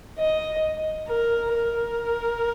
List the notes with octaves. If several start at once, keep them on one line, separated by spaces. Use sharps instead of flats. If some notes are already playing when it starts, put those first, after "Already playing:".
D#5
A#4
A#4